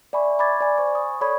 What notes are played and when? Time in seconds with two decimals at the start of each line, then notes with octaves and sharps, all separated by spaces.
0.13 D5 E5 G#5 B5 C#6
0.39 B5 C6 D6 G#6 A6
0.61 D5 G#5
0.78 C5 G#5 C#6
0.95 D#6
1.21 A4 C#5 D5 B5 C#6 G#6